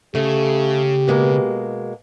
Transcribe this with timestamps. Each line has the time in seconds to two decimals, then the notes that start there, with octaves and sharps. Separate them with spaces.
0.15 C#3 A3 G4
1.08 B2 G#3 A#3